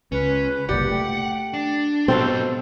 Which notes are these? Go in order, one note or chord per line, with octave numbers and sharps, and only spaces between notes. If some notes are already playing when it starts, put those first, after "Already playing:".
C#2 C#4 B4
F#1 C2 A#2 G4 D5 F#5
A3 G5
D4
G#2 B2 G3 C4 A4 C5 F5